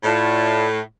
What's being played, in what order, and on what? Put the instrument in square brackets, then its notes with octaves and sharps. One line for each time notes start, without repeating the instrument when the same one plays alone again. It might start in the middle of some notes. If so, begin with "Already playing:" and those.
[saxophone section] A2 [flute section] F4 D5 A5